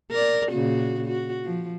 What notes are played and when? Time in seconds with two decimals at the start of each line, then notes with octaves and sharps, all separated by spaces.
0.12 A#4 D5
0.52 A#2 C#3 F#4
1.06 F#4
1.44 F3